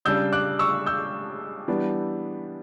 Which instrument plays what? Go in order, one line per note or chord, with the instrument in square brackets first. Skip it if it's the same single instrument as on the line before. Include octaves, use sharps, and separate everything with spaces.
[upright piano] C#3 G3 D4 E6 G6
D6 F#6
C#6 E6
E6 G6
E3 G3 B3 D4